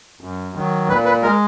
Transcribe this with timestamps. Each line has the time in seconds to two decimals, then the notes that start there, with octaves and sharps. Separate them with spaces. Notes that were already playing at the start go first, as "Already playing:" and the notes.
0.21 F#2
0.55 D#3 F#3
0.89 A#2 B4
1.05 B4
1.23 G#3 A#4